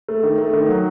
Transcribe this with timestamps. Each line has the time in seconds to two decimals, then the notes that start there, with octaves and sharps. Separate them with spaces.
0.09 A3
0.23 D#3
0.38 A3
0.54 D#3
0.69 F#3